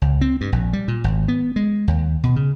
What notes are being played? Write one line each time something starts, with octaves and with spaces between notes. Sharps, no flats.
C#2
C4
G2
A#1
G3
A#2
G#1
B3
G#3
D#2
B2
C#3